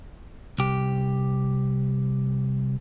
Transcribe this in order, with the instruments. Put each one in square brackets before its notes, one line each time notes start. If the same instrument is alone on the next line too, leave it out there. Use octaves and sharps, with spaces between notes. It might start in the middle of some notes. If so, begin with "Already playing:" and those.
[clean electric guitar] C2 G4